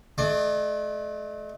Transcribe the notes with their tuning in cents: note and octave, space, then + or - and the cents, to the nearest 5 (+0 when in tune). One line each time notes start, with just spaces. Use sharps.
A3 -40 D5 +40